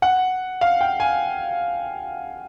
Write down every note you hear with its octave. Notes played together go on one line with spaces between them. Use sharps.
F#5
F5
G5
G#5